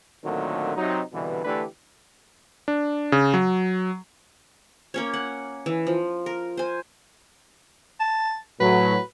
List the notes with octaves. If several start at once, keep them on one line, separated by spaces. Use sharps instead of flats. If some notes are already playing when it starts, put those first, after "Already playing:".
A#2 D3 D#3 F#3 A3 C4
C3 F#3 D#4
C2 G2 B2 D3 E3
D3 E3 A3 D4 G4 B4
D4
C#3
F#3
A#3 C#4 C#5
F#5
E3
F3
A#4
C5 G#5
A5
A2 F#3 B4